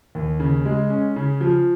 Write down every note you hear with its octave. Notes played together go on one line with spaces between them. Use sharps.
D#2
C#3
G#3
C#4
C#3
F3